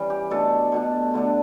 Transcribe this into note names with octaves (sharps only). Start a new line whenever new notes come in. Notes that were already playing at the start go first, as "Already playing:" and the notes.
Already playing: E3 G3 C#4
G4
B2 A3 D4 A4
B2 A3 D4
D3 A3 D4